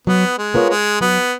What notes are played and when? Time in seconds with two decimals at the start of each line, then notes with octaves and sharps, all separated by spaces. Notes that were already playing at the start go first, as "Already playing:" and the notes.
0.07 F#3 B3
0.38 G#3
0.54 B3 F4 A#4 C#5
0.70 G#3
1.01 F#3 B3